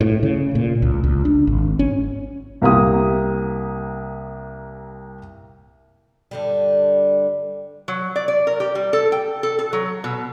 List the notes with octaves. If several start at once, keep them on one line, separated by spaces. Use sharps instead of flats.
A2
C#3
A#2
C#2
C#2
D4
G#1
C#4
C2 A#3 G4 D#6
G2 D3 G3
F#3
D5
D5
A#4
G4
G3
A4
G5
A4
A4
F#3
B2